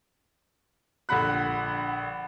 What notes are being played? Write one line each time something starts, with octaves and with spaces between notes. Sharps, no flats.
A#1 D3 F#5 B5 F#6